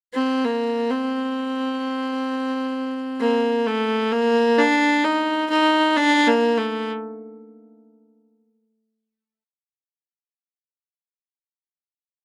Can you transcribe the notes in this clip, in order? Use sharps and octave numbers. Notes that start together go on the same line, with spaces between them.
C4
A#3
C4
A#3
A3
A#3
D4
D#4
D#4
D4
A#3
A3